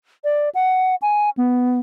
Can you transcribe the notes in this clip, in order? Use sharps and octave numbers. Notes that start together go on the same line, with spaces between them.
D5
F#5
G#5
B3